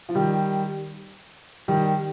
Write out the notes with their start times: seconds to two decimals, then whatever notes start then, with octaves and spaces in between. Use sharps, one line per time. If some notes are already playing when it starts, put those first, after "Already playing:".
0.09 F3
0.15 D#3 G3
1.68 D#3 G3